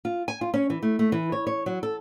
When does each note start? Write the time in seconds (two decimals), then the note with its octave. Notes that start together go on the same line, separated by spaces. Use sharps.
0.05 F4
0.28 G#5
0.41 F4
0.54 C#4
0.70 E3
0.83 A3
0.99 A3
1.12 E3
1.32 C#5
1.47 C#5
1.66 F#3
1.83 A4